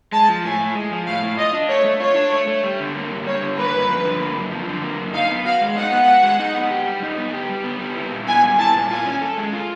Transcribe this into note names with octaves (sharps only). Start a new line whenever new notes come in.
G#3 A5
F3
A2 G#5
A2
G#3
F3
A2 F5
A2
F4 D#5
D4
A3 C#5
A3
F4 C#5
D4
A3
A3
G3
D3
A#3
G2
G3 C#5
D3
A#3 B4
G2
F3
D3
A#3
F#2
F3
D3
A#3
F#2
D#4 F5
B3
F#4 F5
G#3
D#4 F#5
B3
F#4
G#3
D#4
B3
G4
G3
D#4
B3
G4
G3
B3
G3
E4
A#2
B3 G#5
G3
E4 A5
A#2
F4 G#5
C#4
A4
G#3
F4